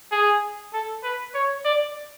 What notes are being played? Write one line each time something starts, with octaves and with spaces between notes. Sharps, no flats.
G#4
A4
B4
C#5
D5